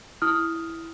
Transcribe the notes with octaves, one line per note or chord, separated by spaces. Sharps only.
E4 D#6 F6